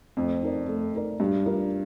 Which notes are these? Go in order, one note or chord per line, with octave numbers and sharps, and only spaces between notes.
F2 A3
D#4 A#4 D5
A3
D#4 A#4 D5
G2 G3
D4 F4 A#4 D5